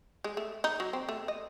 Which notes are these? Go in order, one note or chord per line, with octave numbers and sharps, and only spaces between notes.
G#3
A3
D#4
F#3
C4
A3
D#5